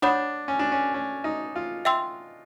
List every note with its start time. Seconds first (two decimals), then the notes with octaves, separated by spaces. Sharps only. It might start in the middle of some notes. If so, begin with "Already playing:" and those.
0.02 D4 C#5 F#5 B5 D#6 G6
0.48 C#4
0.59 D4
0.72 C#4
0.94 C#4
1.24 D#4
1.56 F4
1.85 E5 G5 C6 E6